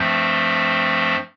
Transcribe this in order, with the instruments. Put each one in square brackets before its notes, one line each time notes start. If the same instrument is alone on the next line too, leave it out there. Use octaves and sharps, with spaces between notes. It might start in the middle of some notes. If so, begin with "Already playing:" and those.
Already playing: [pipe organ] G2 F3 A3 C4